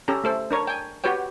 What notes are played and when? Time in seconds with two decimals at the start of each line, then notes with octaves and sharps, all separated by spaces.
0.08 C#4 G4 A4 A#5
0.24 A3 A4 C5
0.51 D4 A#4 C#5
0.67 G5 G#5
1.04 F#4 G4 B4 C#5 G5